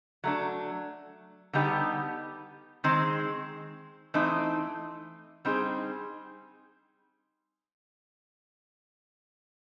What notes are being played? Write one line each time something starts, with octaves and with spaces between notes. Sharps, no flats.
F#3 A3 D4
D3 G3 B3 D#4 G4
D#3 G#3 C4
E3 A3 C4 D#4
G3 C4 D#4 G#4